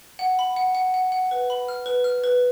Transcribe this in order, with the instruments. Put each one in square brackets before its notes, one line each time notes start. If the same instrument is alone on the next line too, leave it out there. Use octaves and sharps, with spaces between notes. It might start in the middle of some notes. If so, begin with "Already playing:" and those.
[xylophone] F#5
B5
F#5
F#5
F#5
F#5
B4
B5
F6
B4
F6
B4